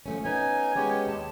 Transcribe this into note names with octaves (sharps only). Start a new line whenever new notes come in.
F3 A3 C#4
B3 C#4 D#4 G#5
G#3 B3 C#4 G4 C#5
D#2 A5